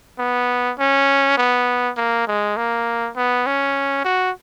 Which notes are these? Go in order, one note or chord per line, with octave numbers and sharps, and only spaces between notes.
B3
C#4
B3
A#3
G#3
A#3
B3
C#4
F#4